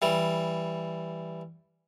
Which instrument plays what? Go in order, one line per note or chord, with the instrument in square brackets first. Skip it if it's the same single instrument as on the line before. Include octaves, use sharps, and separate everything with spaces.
[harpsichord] E3 G3